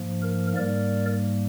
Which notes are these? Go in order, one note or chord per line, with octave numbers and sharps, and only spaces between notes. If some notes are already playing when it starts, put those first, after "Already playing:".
Already playing: G#2 F3 A#3
A#4
G#2 G3 A#3 A#4 D5